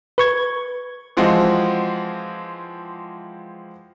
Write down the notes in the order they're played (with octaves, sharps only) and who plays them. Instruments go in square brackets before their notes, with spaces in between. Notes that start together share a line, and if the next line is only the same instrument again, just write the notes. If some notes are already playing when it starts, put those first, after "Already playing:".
[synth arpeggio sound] B4 C#6 G#6
[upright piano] E3 F3 G#3 C4 F#4